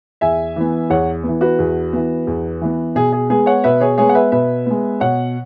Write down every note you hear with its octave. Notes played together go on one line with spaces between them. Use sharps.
E2 E5 G#5
E3 B3
E2 C#5 F#5
E3 B3
F#4 B4
E2
E3 B3
E2
E3 B3
B2 G#4
G#4
G#3 B3 G#4
C#5 F#5
B2 B4 E5
G#4 C#5
G#3 B3 G#4 C#5
F#5
B4 E5
B2 B4 E5
G#3 B3
B2 C#5 F#5